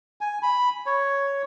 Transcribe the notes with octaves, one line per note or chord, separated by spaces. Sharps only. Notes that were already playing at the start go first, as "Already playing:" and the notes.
G#5
B5
C#5